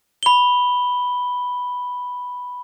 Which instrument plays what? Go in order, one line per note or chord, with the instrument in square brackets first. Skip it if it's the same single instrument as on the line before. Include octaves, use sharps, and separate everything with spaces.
[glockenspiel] B5 G7